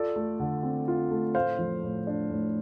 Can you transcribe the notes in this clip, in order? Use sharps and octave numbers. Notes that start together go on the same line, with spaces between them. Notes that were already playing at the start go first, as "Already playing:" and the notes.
Already playing: F4 A4 D5
A3
D3
C4
F4
A3
A2 C5 F5
F3
A2
D4
A2